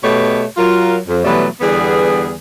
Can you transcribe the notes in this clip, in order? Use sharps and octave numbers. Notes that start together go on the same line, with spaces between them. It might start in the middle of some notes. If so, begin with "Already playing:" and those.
B2 A3 G4 B4 C#5 D#5
F#3 F4 A#4
F2
B2 E3 F#3 G3 A3 B3
E2 D3 G3 B3 G#4